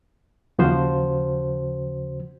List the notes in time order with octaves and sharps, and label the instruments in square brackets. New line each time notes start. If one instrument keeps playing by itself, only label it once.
[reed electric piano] D#2 C#3 F3 F#4 C5